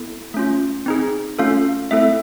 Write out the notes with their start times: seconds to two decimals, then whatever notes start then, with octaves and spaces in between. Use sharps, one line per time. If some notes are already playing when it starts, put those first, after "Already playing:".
Already playing: B3 E4 A4
0.34 A3 C#4 F4
0.86 C4 D#4 G#4
1.39 A3 C#4 F4 A4 F5
1.91 A3 C4 E4 A4 E5